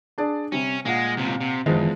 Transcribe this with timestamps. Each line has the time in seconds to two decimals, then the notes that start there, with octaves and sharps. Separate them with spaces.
0.18 D4 G#4 D5
0.52 C3 G3 C#4
0.85 A#2 G#3 F#5
1.17 C#2 C3
1.41 C3
1.66 F#1 E2 D#3 F3 G#3